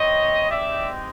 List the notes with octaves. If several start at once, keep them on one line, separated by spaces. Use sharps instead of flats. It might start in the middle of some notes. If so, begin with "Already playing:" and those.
Already playing: C4 E4 G4 C#5 D#5
G#3 C4 D#4 G4 D5 E5